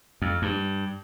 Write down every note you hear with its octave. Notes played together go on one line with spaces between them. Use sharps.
F2
G2